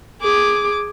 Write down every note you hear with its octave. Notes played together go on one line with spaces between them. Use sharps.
G#4 D6